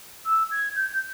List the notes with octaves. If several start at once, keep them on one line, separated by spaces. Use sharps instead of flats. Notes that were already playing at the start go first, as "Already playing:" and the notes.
E6
G#6
G6